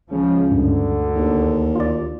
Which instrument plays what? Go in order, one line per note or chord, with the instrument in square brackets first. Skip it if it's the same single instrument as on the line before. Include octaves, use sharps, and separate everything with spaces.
[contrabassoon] C#2 [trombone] C#3 [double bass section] F3
[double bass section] D2 [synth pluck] G2 [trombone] D3
[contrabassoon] D#2
[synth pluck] F4 D5